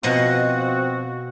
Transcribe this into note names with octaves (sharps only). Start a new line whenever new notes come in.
B2 F3 C4 F#4 D#5 F#5